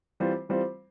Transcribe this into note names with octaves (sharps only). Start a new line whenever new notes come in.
E3 G3 C4 F4 C5
E3 G3 C4 F4 C5